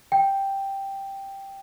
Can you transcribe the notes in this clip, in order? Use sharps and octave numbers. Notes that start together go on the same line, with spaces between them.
G5